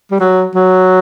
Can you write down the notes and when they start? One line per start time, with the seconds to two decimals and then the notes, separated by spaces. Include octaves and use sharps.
0.11 G3
0.20 F#3
0.55 F#3